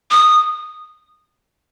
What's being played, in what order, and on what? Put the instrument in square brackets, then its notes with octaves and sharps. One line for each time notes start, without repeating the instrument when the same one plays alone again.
[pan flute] D#6